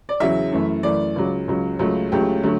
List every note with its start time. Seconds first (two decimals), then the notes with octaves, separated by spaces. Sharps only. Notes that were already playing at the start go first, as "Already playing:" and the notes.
0.09 D5
0.20 E2 C#3 F#3 E5
0.52 F#2 E3 A3
0.83 F#2 E3 A3 D5
1.16 C#2 C#3 F#3
1.48 C#2 C#3 F#3
1.79 C#2 C#3 F#3 A3
2.12 C#2 C#3 F#3 A3 G4
2.43 D3 F#3 A3